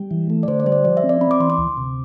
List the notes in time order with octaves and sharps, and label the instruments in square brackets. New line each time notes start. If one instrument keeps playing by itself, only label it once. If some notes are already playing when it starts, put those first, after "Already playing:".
Already playing: [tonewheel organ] G3
E3
A3
[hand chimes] D5
[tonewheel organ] D3 [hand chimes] C5
[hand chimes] D5
[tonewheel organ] G3 [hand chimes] C5
[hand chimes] D5
[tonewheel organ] F3 [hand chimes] D5
[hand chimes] E5
[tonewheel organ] C4
[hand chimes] D5
[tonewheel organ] C4 [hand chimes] B5
[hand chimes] D6
[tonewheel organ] E3 [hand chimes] C6
[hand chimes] D6
[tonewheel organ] D2
C3